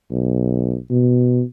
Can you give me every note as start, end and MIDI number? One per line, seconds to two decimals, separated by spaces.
0.11 0.77 35
0.90 1.43 47